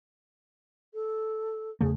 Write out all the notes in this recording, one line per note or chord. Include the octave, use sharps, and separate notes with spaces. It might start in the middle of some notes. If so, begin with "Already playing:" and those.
A4
E2 C#3 A3 G#4